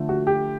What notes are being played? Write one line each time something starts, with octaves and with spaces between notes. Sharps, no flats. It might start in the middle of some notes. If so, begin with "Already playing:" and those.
Already playing: D3 F3 A3
F#4
G4